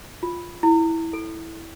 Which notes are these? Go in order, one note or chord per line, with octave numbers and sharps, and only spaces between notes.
F4
E4
A4